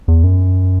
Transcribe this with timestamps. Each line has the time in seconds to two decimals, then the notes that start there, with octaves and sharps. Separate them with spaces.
0.08 E2
0.24 F#2